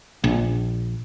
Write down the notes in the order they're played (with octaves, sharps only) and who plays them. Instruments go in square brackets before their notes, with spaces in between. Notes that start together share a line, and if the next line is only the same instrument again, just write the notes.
[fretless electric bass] A#1